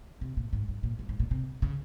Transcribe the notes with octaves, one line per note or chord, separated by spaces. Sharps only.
C3
A#2
G#2
G2
A#2
G2
G#2
A#2
C3
C#3